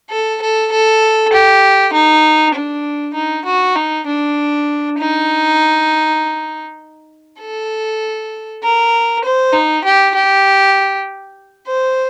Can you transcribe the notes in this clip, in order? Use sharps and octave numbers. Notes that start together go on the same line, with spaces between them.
A4
A4
A4
G4
D#4
D4
D#4
F#4
D#4
D4
D#4
A4
A#4
C5
D#4
G4
G4
C5